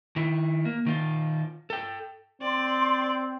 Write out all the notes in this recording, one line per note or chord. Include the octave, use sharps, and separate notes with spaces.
D#3 E4
A#3
D#3 F4
A4 G5
C4 D5 C6